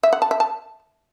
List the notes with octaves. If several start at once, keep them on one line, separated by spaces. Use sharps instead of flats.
E5
F#5
A5
E5
A5